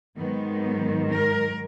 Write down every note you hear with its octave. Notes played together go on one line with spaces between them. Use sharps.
G#2 D#3 F#3 B3
A#4